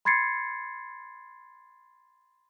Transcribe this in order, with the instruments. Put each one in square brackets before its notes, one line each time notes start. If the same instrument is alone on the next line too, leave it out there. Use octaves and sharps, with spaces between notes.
[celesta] B5 C6 G#6 A6 C7 C#7